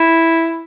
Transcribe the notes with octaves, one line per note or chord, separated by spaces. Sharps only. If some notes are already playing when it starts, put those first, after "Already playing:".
Already playing: E4